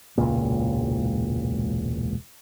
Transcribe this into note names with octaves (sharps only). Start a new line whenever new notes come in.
E1 C#2 A#2